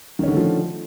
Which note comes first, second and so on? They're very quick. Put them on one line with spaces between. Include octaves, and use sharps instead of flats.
D#3 C#4 D3 A3 F3